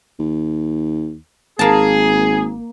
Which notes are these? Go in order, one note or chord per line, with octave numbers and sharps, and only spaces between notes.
D#2
G#1 A#3 G#4 A5